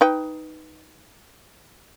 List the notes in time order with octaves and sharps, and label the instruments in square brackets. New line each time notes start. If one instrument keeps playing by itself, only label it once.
[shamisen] D#4 B4 G5